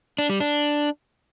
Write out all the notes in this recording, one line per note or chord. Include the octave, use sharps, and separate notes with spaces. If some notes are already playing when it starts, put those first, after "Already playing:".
D4
G3
D4